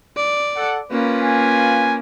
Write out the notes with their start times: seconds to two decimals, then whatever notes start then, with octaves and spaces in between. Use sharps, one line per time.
0.17 D5
0.56 A4 F#5
0.91 A#3 C#4 F4 B4
1.22 G#5